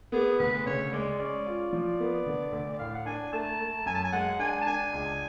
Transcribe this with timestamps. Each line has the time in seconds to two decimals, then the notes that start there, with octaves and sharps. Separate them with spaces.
0.12 B3 G#4
0.39 D2 B4
0.66 C#3 C#5
0.92 G#3 D5
1.19 C#4 D5
1.46 F4
1.73 F3 D5
2.00 B3
2.26 D3
2.52 D2
2.73 D5
2.79 A2 F5
2.95 F#5
3.06 D4 G#5
3.32 A3 A5
3.60 A3
3.86 F#2 G#5
3.95 A5
4.04 G#5
4.12 G#3 F#5
4.39 D4 G#5
4.61 A5
4.66 D4 G#5
4.92 C#2